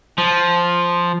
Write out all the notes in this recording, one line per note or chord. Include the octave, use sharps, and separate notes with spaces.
F3